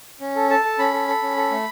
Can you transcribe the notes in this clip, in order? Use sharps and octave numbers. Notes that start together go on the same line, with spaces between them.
C#4
A4
A4 A5
A4
C#4 B5
A4
A4
C#4
A4
A3